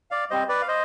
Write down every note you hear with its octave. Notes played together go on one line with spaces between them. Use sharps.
D5 F5
G3 C4 C5 D#5
B4 D5
F5
C5 D#5